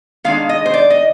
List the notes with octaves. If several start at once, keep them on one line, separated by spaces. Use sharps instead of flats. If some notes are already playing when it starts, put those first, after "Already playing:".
D#3 G#3 D4 F5
D#5
C5
D5
D#5